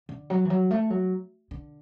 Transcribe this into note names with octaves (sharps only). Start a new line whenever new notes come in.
D3
F#3
E3
F#3
A3
F#3
D3